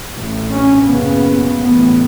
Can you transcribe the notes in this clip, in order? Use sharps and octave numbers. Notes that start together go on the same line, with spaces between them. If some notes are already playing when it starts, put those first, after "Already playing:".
A1 A2
C#4
F#1 F#2 C#3 B3
A1 A2 B3